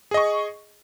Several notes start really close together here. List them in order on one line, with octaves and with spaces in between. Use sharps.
G#4 D#5 C#6